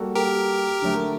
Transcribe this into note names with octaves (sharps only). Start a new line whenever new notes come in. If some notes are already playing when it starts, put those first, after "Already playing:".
Already playing: G3 A#3 F#4 A4
G4 A#4
D3 F#3 A3